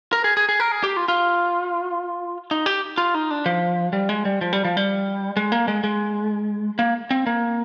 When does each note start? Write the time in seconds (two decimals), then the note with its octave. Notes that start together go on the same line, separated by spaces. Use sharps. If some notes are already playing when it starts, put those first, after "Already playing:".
0.13 A#4
0.24 G#4
0.37 G#4
0.49 G#4
0.60 A#4
0.72 G#4
0.84 G4
0.97 F4
1.08 F4
2.51 D#4
2.66 G4
2.98 F4
3.14 D#4
3.30 D4
3.46 F3
3.93 G3
4.09 G#3
4.25 G3
4.41 F3
4.53 G3
4.65 F3
4.77 G3
5.37 G#3
5.52 A#3
5.68 G#3
5.84 G#3
6.79 A#3
7.11 C4
7.26 A#3